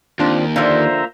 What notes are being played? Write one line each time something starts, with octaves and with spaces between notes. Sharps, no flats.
D#2 C4 D4 F4
D3 F3 A#3 F4 C5 E5 A#5